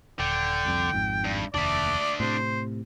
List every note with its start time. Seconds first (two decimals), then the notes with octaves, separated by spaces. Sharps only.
0.20 D#1 D3 G5
0.65 F1 C2 F2
0.94 G#1 F2 G#2
1.25 G2
1.54 F1 D#2 D4 D5 E5
2.20 A2 C3 C5